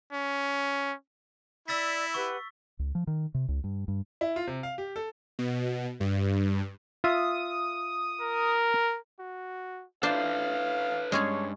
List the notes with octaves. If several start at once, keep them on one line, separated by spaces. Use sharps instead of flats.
C#4
E4 D5 E6 A6 B6
G4 B4 F#5 C#6
C#2
F3
D#3
C3
C#2
G2
G2
E4
F4
C3
F5
G4
A4
B2
G2
F4 E5 D#6
A#4
F#4
D4 F4 A4 B4 C5 E5 F5
G2 G#3 C#4 G#4 C#5